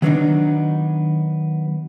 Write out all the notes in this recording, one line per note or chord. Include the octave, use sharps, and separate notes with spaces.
D#3 F#3 A3 B3 D4 D#4